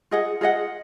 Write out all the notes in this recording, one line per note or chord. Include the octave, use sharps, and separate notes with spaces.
F4 G#4 D#5 F#5
F4 G#4 D#5 F#5